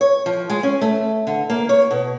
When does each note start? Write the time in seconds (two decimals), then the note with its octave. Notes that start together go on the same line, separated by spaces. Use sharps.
0.01 C#5
0.26 F3
0.50 G#3
0.63 C#4
0.81 A3
1.27 D3
1.50 A#3
1.69 C#5
1.91 B2